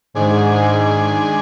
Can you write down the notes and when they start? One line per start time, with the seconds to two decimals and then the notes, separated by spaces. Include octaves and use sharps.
0.15 G#2 D#3 G#3 D4 G#4